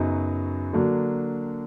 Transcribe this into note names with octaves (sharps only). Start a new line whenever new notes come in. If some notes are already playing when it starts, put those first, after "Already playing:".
Already playing: F#2 C#3 F#3 B3 D#4
D3 F#3 A#3 D4